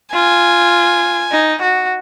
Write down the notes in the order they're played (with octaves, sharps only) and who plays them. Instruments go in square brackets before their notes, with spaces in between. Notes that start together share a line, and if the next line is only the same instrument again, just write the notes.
[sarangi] F4 [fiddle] G#5
[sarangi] D#4
F#4